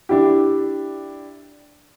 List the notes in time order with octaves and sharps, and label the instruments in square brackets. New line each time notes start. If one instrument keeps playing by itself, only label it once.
[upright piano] D4 E4 G4